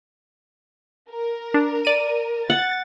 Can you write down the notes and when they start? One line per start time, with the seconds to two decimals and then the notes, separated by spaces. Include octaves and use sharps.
1.10 A#4
1.54 D4
1.85 D5 D#7
2.50 F#5 A6